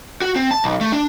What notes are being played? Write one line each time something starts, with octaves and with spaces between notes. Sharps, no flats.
F#4
C4
A5
B1
A3
D4